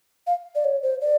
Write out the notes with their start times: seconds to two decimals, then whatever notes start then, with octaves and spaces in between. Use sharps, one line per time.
0.27 F5
0.55 D5
0.65 C#5
0.83 C5
1.01 D5